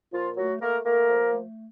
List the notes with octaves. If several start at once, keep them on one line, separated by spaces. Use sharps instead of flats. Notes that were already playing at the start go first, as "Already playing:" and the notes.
A#2 F3 F4
F#3 A3 F#4
A3 A#3 A#4
A3 A#3 A#4
F3
A3